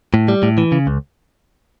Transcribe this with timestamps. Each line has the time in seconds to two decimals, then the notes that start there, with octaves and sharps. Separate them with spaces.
0.14 A2
0.28 G3
0.43 A2
0.58 E3
0.72 C#3
0.87 C#2